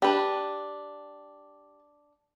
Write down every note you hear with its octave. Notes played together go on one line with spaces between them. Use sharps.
D4 G4 B4 A5